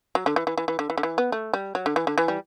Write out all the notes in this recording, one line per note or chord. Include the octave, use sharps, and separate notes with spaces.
F#3
D3
E3
E3
E3
E3
D3
E3
D3
E3
B3
A3
G3
F#3
D3
E3
D3
E3
G3